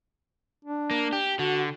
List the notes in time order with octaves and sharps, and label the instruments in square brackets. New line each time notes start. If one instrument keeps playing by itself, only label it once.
[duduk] D4
[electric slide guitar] A#3
G4
[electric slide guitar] D3 [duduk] F#4